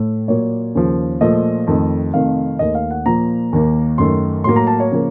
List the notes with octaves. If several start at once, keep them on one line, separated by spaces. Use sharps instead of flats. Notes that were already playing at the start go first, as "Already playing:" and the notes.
Already playing: A2 A3
A#2 F#3 A#3 C#5
D#2 C#3 F3
A#2 F3 A3 D#5
F2 D#3 A3
F2 C3 D#3 A3 F5
D#2 D#3 A3 D#5
F5
F#5
A#2 F3 A#3 A#5
D#2 D#3 A#3
F#2 D#3 A3 C6
A2 F#3 A#3 C6
A#5
A5
C#5
C#3 F3 A#3